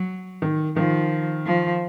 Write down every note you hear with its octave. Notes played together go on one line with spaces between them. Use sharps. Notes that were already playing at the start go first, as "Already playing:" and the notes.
Already playing: F#3
D#3
D#3 F3
F3